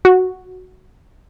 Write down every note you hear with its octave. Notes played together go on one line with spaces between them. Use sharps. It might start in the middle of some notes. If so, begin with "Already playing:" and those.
F#4